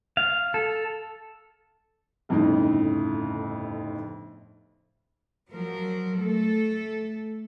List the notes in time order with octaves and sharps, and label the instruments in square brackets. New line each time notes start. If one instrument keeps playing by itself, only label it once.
[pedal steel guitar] F5
A4
[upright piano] G1 F2 A2 C#3 D#4
[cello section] F3 F#3 A#4
A3 A4